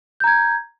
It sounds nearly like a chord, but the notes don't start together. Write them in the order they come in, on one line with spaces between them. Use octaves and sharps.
G6 A#5 G#6